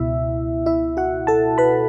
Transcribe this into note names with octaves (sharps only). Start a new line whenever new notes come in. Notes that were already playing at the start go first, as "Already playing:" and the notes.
Already playing: C#2 B2 E4 E5
E4 E5
F#4 F#5
A4 A5
B4 B5